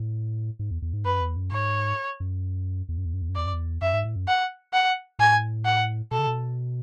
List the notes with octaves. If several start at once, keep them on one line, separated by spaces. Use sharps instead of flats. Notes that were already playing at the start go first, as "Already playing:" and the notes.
Already playing: A2
G#2
E2
E2
G#2
F#2 B4
E2
F#2
G#2 C#5
F#2
E2
F#2
E2
F#2
E2
F#2
E2 D5
F#2
E2
F#2 E5
G#2
A2
F#2
F#5
F#5
A2 G#5
F#5
B2 A4
C#3
B2